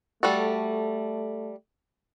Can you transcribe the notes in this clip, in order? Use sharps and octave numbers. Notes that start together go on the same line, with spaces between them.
G3 A3 F#4 A4